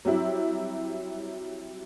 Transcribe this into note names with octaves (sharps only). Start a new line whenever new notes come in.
F#3 G3 C4 E4